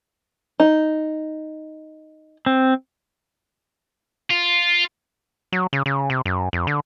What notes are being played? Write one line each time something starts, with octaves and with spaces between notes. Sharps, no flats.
D#4
C4
F4
F#3
C#3
C#3
C3
F#2
F2
D3